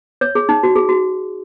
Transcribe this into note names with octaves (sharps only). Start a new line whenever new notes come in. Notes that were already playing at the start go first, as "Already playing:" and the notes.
C#5
G#4
D#4
F#4
G#4
F#4